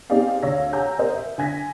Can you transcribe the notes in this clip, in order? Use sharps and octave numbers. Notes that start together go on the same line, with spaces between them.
C4 D#4 G4 G#4 D5 F5
D2 C#5 F5 E6 A#6
F#5 G#5 A#5 E6 G6
A#4 C5 D#5
E5
D3 G#5 G#6 A#6 B6